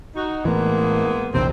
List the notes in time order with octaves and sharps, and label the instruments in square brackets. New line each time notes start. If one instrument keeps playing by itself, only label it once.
[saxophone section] D#4 F#4
[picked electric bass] A2 E3 [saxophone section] G#3 A#3 B3
[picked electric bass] A#1 E2 C3 [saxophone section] C4